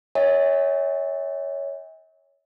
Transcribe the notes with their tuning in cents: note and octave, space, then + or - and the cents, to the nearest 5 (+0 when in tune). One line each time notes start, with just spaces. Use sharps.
C#5 +10 E5 -45 G#5 -45